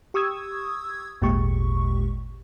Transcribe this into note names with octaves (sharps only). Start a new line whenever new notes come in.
G4 C#6 D#6 E6 G#6
G#1 D#2 A#2 G#3 G4 C#6